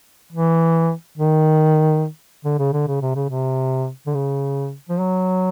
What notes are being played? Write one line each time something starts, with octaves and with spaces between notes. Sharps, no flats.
E3
D#3
D3
C#3
D3
C#3
C3
C#3
C3
D3
C#3
F3
F#3